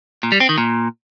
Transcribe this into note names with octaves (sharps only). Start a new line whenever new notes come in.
A#2
G3
C4
D#3
A#2